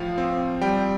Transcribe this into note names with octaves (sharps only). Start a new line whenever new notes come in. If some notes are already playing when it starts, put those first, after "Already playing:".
Already playing: A2 F3 F5
C4
G3 G5